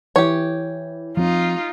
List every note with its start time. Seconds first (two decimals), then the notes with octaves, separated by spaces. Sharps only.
0.16 E3 G4 C#5
1.17 F3 C4 D#4 F4